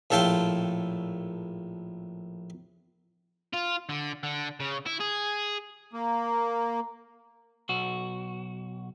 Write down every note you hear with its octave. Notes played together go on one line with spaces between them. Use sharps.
A#1 A2 A4 F5 G5 C6
F4
D3
D3
C#3
E4
G#4
A#3
B1 F#4